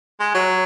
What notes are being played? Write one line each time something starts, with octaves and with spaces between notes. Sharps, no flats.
G#3
F#3